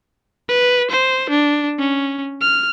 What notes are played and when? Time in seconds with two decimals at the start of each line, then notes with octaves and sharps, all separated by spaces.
0.49 B4
0.90 C5
1.30 D4
1.78 C#4
2.41 F6